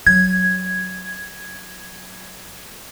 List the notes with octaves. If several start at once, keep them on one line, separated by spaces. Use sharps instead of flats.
F#3 G#6